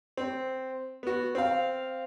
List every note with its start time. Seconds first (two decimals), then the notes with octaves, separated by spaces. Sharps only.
0.18 C4
1.03 B3 F#4
1.35 C4 F5